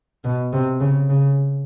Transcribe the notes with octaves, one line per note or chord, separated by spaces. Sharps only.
B2
C3
C#3
C#3